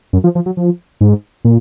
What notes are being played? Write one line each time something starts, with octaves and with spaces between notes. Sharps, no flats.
F#2
F3
F3
F#3
F3
G#2
A#2